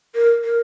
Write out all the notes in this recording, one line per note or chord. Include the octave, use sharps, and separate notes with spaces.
A#4
A#4